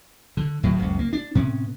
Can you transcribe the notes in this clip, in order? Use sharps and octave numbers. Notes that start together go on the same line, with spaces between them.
D3
D1 A2 D#3 F#3
F#1 C#2
A#3
D4
A2 C3 B3 C#4